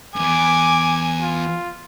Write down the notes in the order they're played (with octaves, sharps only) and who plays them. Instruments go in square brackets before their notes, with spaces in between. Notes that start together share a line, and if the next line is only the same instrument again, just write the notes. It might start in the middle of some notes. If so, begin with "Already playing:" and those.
[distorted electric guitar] E2 G2 [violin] G#5 [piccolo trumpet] D6
[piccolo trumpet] F4